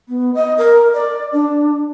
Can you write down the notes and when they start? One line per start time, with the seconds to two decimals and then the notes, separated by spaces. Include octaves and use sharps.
0.09 B3
0.34 D#5
0.58 A#4
0.93 D5
1.33 D4